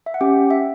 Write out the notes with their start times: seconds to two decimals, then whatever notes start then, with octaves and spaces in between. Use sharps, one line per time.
0.06 E5
0.14 F#5
0.21 C#4 G4 G5
0.51 E5